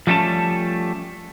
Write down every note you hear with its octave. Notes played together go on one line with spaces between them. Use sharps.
F3 G3 A3 C#4 A5